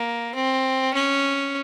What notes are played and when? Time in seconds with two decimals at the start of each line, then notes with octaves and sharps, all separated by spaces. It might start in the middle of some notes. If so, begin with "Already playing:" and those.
Already playing: A#3
0.35 C4
0.94 C#4